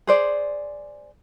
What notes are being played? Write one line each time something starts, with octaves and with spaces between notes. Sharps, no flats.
G#4 C5 D5